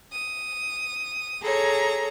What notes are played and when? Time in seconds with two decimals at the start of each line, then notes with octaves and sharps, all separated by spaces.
0.12 D#6
1.43 G#4 A4 C#5 A#5